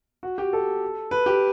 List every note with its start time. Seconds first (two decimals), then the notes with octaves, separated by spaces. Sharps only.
0.23 F#4
0.38 G4
0.53 A4
1.11 B4
1.26 G4